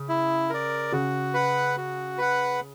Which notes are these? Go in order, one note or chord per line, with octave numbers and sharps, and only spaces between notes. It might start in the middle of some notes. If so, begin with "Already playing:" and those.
Already playing: C#3
E4
A#4 D5
C#3 F#4
B4 F#5
F#4
B4 F#5